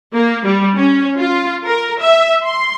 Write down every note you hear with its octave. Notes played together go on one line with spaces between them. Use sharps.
A#3
G3
C#4
F4
A#4
E5
C6